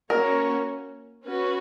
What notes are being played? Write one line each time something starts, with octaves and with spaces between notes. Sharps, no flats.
A#3 C#4 F#4 A#4 C#5
C#4 F#4 B4